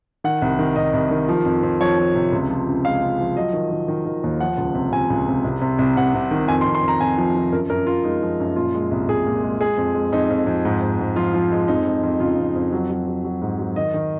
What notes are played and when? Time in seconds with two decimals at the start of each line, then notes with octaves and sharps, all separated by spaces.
0.24 D#3 F#5
0.42 C2
0.59 D#3
0.76 C2 D#5
0.93 C2
1.11 D#3
1.29 F3
1.45 F2
1.63 F2
1.80 F3 C#5
1.98 F3
2.15 C3
2.32 C#2
2.50 F3
2.67 C#3
2.85 G#3 F5
3.02 C#3
3.20 F3
3.36 F#3 D#5
3.53 D#3
3.71 D#3
3.88 D#3
4.05 D#3
4.24 D#2
4.40 F3 F#5
4.57 C#2
4.74 C3
4.92 C3 G#5
5.10 C#2
5.28 C3
5.44 C2
5.61 C3
5.79 C2
5.97 C3 F#5
6.14 C3
6.31 D#3
6.48 F2 G#5
6.61 C6
6.66 F2
6.75 C6
6.83 F2
6.88 A#5
7.00 F2 G#5
7.18 F3
7.35 F3
7.52 F#2 A#4
7.70 F#2 A#4
7.87 F#2 F4
8.04 G#3 D#4
8.22 F3
8.40 F#2
8.56 A#2 F4
8.74 G#3
8.91 C2
9.08 C2 G#4
9.26 A#2
9.43 G#3
9.60 G#3 G#4
9.78 F2
9.95 G#3
10.12 F2 D#4
10.30 F2
10.47 F2
10.65 G#2
10.82 G#2
10.99 G#2
11.16 F3 F4
11.34 F3
11.52 G#3
11.68 F2 D#4
11.86 F2
12.03 F2
12.20 C#3 F4
12.38 F2
12.55 F2
12.72 F#3
12.90 F#3
13.07 F#3
13.24 F#3
13.42 G#2
13.59 F#3
13.76 D#3 D#5
13.94 D#3